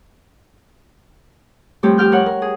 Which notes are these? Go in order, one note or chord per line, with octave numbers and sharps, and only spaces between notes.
F2 G3 A3 C4 G4 C#5
G4 G5 F6 G6
A#4 C#5 F#5
A#4
G#4